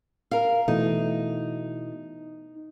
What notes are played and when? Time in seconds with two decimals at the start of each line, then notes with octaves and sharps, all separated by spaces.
0.31 A#4 F5
0.68 B2 E3 A3 D#4